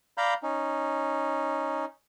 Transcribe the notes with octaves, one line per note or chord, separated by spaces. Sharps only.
D5 F5 A#5 B5 G6
C#4 D#4